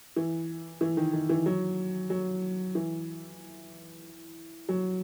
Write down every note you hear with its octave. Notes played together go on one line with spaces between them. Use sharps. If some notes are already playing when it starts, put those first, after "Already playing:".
E3
E3
D#3
D#3
E3
F#3
F#3
E3
F#3